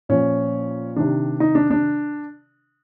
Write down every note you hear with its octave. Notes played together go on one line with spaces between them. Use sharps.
A#2 F3 C#4
C3 D#3 D4
D#4
D4
D4